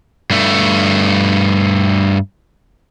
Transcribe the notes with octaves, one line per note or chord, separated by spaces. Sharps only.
G2 A3